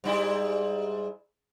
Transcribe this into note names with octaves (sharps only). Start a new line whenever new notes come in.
G#2 G3 E4